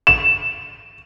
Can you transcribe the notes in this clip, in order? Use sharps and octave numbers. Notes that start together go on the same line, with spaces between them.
E7